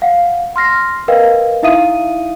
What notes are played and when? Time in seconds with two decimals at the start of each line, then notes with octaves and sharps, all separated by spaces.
0.02 F5 F#5
0.56 C6 F6 A#6 C7
1.08 A#4 B4 D#5 F5 G5
1.63 D#4 E4 E5 F5 D#6 D#7